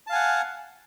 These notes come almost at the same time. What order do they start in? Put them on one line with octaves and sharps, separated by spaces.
A5 F5 G#5 F#5